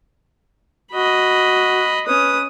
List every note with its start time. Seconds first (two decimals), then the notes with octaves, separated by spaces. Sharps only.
0.93 F#4 D#5 B5
2.06 C#4 B4 D#6